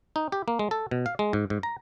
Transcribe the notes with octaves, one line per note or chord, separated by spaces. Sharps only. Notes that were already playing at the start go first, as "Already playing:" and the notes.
D#4
G4
A#3
G#3
A4
B2
F5
G#3
G#2
G#2
A#5